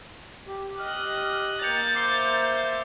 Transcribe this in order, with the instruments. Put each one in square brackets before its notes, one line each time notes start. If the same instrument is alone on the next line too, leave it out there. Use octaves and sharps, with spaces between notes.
[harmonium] G4
[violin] D#5 F#6 [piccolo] F6
[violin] A#3 A6 [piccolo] G6 [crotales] C#7 F7
[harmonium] C5 E5 [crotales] D6 C7 G7